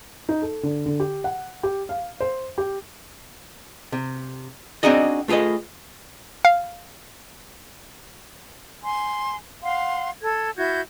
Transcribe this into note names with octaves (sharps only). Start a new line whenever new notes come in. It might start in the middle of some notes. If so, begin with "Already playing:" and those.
D#4
A4
D3
D3
G4
F#5
G4
F5
C5
G4
C3
C4 D4 D#4 F#4 G#4 D#5
A3 F4 G#4 B4 D#5
F5
G#5 C6
F5 F#5 C6
A4 G#6
E4 F#4 G6 G#6